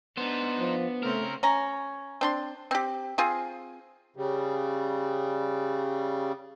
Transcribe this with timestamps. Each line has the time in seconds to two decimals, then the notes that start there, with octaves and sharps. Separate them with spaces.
0.17 B3 D4 D#4 C5
0.59 F3
1.03 C#3 A3 C4 C#4 A#4
1.43 C#4 A#5
2.21 C4 D4 C6
2.71 C4 G4
3.18 C4 F4 G#4
4.16 C#3 G3